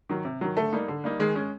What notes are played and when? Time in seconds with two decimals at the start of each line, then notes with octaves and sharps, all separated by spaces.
0.09 D#3 F#3
0.25 C3
0.41 D#3 F#3
0.56 D3 A3 A4
0.73 G3 A#3 D#4
0.88 D3
1.04 G3 A#3 D#4
1.19 D#3 G#3 G#4
1.36 G#3 C#4